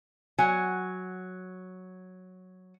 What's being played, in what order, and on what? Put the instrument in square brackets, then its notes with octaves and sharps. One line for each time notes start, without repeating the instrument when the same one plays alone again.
[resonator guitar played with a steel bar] F#3 G#5